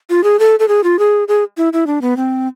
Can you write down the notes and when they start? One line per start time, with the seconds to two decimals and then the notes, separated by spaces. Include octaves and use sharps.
0.10 F4
0.24 G#4
0.39 A4
0.59 A4
0.68 G#4
0.84 F4
0.99 G#4
1.28 G#4
1.57 E4
1.73 E4
1.87 D4
2.02 B3
2.17 C4